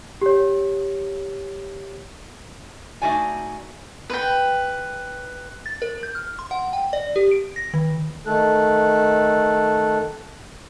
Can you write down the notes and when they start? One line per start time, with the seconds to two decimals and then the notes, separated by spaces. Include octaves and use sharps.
0.21 G4 C#5
3.02 A3 D#4 F#4 D5 G#5
4.10 B4 G5
5.66 A6
5.82 A#4
6.03 G6
6.15 F6
6.39 C6
6.51 F#5
6.73 G5
6.93 D5
7.16 G4
7.31 D7
7.56 A#6
7.74 D#3
8.27 D#3 A3 A4 F#6